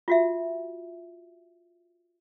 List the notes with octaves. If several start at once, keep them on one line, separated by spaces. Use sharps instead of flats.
F4 F#4 E5